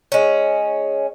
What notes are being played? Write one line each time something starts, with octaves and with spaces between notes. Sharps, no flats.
G#3 C#4